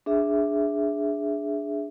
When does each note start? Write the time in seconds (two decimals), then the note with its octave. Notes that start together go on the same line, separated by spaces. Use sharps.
0.06 D4 G#4 E5